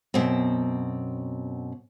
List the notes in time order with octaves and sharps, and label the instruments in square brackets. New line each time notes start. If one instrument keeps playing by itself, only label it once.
[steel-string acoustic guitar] F#2 B2 C4